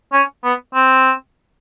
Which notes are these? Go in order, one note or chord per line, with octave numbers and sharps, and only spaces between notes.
C#4
B3
C4